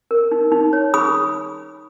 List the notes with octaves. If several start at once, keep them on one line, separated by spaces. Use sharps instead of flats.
A#4
D#4
D#4
C#5
G#4 B5 D#6